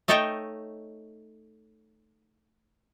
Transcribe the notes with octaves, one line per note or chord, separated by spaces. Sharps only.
A3 D#4 A4 C#5 D#5 G5